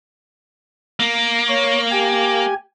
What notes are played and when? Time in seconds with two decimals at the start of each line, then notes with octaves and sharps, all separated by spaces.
1.00 A#3
1.49 C#5
1.92 G4 G#5